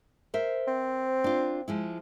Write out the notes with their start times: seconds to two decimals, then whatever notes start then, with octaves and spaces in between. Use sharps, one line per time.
0.34 A#4 C5 E5
0.67 C4
1.24 D4 F4
1.68 F3 G#3 E4